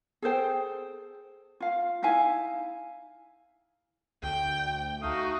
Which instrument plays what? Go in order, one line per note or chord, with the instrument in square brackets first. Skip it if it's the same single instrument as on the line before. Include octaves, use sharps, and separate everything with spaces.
[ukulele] G#4 A4 C5 G5
F4 F5
D#4 E4 F5 G#5
[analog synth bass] D2 [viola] G5
[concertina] A3 F5 D#6 [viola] D#4 F#4